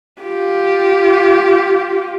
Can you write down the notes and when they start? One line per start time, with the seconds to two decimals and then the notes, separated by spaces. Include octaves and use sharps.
0.22 F4 G4